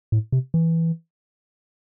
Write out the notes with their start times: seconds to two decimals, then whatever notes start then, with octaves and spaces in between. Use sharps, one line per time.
0.12 A2
0.32 C3
0.54 E3